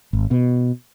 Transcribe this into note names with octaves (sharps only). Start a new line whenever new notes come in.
G#1
B2